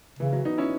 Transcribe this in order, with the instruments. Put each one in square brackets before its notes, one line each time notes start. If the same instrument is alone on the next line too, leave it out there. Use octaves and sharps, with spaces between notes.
[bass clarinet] C#3 [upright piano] E3
[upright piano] F#3
B3 D#4
C#4 E4